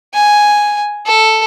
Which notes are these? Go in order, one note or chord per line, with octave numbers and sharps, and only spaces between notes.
G#5
A4